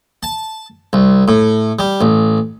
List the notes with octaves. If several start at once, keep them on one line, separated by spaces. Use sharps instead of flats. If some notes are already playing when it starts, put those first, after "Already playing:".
A5
C2
A2
G3
A1